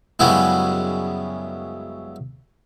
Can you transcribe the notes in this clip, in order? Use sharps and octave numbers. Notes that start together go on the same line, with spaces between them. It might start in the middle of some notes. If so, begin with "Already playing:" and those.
F#2 C#3 G3 G#3 B3 E4